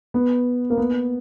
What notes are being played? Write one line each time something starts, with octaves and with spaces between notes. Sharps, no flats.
B3
A#3
B3